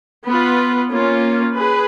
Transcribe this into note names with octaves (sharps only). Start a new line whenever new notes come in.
B3 F4 B4
A#3 C#4 F4
G#4 B4